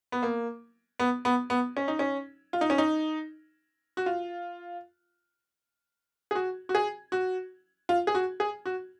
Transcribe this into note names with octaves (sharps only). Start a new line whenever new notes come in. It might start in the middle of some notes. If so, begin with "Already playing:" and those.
B3
A#3
B3
B3
B3
C#4
D#4
C#4
F4
D#4
C#4
D#4
F#4
F4
G#4
F#4
F#4
G#4
F#4
F4
G#4
F#4
G#4
F#4